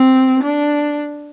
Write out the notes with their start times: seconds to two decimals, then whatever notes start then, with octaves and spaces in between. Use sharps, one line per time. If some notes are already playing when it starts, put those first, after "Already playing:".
Already playing: C4
0.44 D4